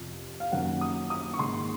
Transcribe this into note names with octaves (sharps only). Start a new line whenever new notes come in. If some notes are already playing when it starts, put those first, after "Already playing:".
Already playing: F2 C3 F3
F5
F#2 D#3 A#3 C#4 F#5
D#6
D#6
C#6
G#2 D#3 A#3 C6